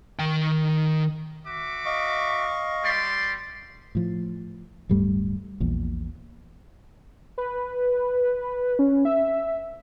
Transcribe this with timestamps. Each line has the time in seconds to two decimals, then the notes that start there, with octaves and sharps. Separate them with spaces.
0.19 D#3 G5
1.46 F#4 E5 D6
1.86 D#5 F5 C#6
2.83 G3 D5 C6
3.95 A2 F3
4.89 D1 G2 G3 A3
5.60 A#1 E2 A#2
7.38 B4
8.79 C#4
9.05 E5